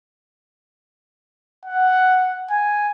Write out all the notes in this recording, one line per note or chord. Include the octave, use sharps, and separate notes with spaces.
F#5
G#5